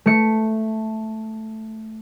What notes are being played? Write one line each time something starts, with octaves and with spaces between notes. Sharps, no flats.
A3 C#7